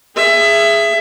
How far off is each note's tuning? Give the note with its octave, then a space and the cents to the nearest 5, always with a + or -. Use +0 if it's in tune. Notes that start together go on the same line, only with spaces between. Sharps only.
G#4 +0 E5 +20